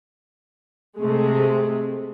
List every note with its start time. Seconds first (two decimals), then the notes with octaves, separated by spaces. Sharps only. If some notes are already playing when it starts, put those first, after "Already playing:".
0.97 C3 G#3 A3